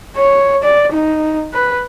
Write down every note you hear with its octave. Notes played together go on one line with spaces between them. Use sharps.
C#5
D5
D#4
B4